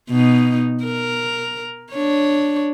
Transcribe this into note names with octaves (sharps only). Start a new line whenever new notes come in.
B2 D#4
A#4
D4 C#5